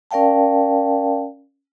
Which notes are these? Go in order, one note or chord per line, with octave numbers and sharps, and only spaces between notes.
C#4 A#4 D5 F5 G5 A5